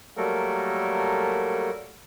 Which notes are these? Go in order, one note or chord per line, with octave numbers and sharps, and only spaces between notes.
F#3 G3 A3 A#3 A4 A#4